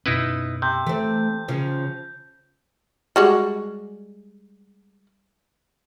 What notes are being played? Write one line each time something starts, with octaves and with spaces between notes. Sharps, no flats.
F#2 B2 C#4 D#4 E4 B4
C3 G6
E3 A3 C4
C#3 F3 C#4
G3 G#3 F#4